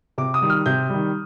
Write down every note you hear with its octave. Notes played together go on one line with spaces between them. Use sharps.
C3 D6
D#6
D#3 G3
F6
C3 G6
D#3 G3